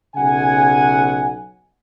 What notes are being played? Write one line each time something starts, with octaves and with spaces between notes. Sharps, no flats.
B1 C#3 F#5 G#5